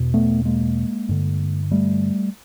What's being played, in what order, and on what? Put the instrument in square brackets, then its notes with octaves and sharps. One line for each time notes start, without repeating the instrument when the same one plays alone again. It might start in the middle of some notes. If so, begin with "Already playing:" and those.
Already playing: [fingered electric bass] E2 B2
A3 B3
G#3 A#3
G2 D3
G3 A3